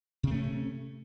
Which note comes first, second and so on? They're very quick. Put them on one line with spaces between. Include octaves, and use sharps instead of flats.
C3 C4 A3 C#4